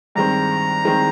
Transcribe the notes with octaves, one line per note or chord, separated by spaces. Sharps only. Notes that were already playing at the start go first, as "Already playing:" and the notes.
G2 D#3 G#3 C4 A#5
D#3 G#3 C4